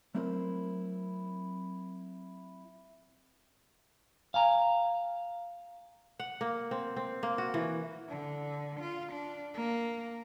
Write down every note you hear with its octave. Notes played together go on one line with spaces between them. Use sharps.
F#3 A3 C4 E4 A#4 C5
F5 G#5 A#5
F#5
A#3
C4
C4
A#3
F#4
E3
D3
F4
D4
A#3